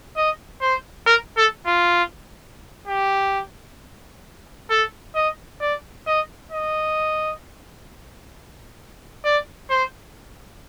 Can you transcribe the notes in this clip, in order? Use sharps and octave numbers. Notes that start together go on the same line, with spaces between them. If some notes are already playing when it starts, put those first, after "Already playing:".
D#5
C5
A#4
A4
F4
G4
A4
D#5
D5
D#5
D#5
D5
C5